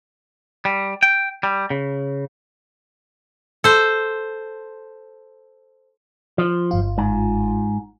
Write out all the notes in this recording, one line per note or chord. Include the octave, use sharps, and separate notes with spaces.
G3
G5
G3
C#3
A4 C5
F3
G1 F4
G#2